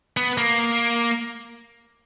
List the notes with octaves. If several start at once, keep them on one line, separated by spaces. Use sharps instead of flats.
B3
A#3